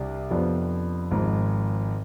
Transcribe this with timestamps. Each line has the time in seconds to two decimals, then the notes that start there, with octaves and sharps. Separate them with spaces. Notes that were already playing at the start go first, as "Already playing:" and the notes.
Already playing: C2 C3 G3 D4 G4
0.30 F2 C3 F3 B3 D4
1.11 G#1 G#2 F3